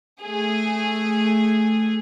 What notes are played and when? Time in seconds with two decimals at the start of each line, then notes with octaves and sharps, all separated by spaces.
0.21 A3 G#4